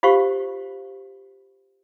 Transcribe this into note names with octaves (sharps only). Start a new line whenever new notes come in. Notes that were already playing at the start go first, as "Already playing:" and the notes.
F4 G4 C5 F5 C#6